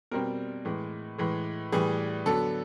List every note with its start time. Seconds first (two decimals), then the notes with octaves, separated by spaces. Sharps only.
0.11 B2 G3 C4 A#4
0.65 A2 E3 G#3
1.18 A2 E3 G#3
1.72 A2 E3 G3 G#4
2.26 D3 F#3 B3 A4